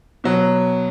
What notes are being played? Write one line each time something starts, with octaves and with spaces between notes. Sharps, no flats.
B2 F#3